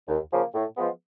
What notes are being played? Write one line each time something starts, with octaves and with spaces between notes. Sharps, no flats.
D#2
C#3 F3 A#3
A2
F3 G#3 B3